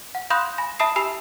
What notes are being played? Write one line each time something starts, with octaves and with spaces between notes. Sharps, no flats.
F#5
F5 B5 C6 D#6 F#6 G6
G#5 B5 A#6
E5 A5 B5 D#6 C7
G4 G#5 B5 E6 C7 F7